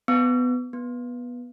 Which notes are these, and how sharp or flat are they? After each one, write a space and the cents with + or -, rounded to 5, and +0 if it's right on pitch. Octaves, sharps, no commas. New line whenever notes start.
B3 +15
B3 -15